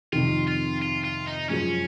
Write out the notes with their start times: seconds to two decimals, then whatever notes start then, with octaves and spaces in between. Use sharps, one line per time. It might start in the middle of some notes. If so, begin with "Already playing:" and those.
0.13 F2 C3 D#3 F4
0.47 F4
0.82 F4
1.04 F4
1.27 D#4
1.49 F#2 F3 G#3 C#4